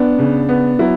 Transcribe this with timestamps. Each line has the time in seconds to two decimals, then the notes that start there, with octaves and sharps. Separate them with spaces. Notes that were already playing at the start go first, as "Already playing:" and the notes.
Already playing: B3 D4
0.18 C#3
0.49 B3
0.79 F#3 E4